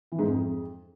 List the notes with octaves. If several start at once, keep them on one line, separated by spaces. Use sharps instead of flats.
E3
G#2
F2